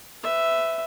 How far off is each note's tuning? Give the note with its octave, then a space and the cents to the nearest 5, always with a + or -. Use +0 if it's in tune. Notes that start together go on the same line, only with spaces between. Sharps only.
B4 +30 E5 +0